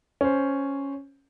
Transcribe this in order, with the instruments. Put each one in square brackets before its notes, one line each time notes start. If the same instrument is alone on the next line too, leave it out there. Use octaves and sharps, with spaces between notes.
[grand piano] C#4 C5